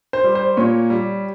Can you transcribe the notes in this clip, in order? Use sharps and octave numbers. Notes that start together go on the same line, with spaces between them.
C5
G3
C5
A#2 C#5
G3